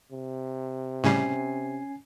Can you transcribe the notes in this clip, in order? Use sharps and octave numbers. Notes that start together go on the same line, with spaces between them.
C3
A2 C#3 G3 C#4 G#5 C7